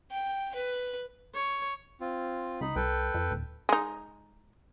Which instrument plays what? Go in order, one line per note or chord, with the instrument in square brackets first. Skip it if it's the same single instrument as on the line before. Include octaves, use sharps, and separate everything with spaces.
[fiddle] G5
B4
[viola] C#5
[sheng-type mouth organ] C4 F4
[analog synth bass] C#2 [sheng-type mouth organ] D#4 B5
[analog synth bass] C2 [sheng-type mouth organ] A4 B4 G5
[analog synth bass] F2
D#1
[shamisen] G#3 D#4